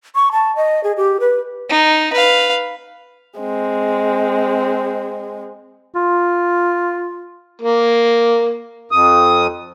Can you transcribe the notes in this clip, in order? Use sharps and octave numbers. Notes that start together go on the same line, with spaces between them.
C#6
A5
D#5
G#4
G4
B4
D#4
B4 F5
G#3 C4
F4
A#3
F2 D#6